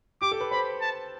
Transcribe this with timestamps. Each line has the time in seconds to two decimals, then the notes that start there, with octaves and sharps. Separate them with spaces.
0.22 G4 D6
0.32 A4
0.40 B4
0.51 C5 B5
0.81 A5